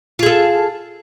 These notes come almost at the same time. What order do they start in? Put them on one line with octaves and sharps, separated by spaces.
F4 G#4 A4